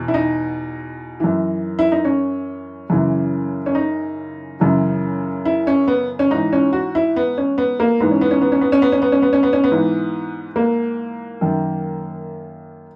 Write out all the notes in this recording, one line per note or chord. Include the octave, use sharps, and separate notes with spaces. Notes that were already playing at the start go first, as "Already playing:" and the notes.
Already playing: E2 B2
E4
D#4
F#2 E3
E4
D#4
C#4
F#2 C#3 E3
C#4
D#4
F#2 C#3 E3
E4
C#4
B3
C#4
G#2 E3 D#4
C#4
F#4
E4
B3
C#4
B3
A#3
G#2 E3 B3
C#4
B3
C#4
B3
C#4
B3
C#4
B3
C#4
B3
C#4
B3
C#4
B3
C#4
B3
G#2 E3
A#3
F#2 D#3